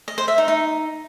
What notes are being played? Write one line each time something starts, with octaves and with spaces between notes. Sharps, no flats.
D#5
C5
E5
D#4
D#4